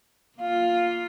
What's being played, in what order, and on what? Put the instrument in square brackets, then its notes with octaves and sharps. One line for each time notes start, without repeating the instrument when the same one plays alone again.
[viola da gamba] A#3 F4 [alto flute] F5